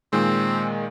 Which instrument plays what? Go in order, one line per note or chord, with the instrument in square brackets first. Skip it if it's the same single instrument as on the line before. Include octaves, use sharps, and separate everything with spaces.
[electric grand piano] A#2 D#3 G#3 [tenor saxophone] C4